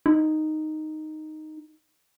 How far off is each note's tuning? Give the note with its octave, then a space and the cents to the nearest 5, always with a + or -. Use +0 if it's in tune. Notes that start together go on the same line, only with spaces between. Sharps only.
D#4 -5